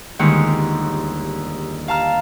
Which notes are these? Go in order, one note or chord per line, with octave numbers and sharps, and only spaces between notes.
G1 D#2 D#3 G#3 G#4 C#7
F5 A5 A#5 F6